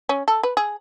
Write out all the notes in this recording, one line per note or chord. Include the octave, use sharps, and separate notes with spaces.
C#4
A4
B4
G#4